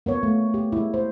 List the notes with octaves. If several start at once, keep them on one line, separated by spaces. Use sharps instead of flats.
A#3 B3 C#5
A3
G4
G#3 E4
C5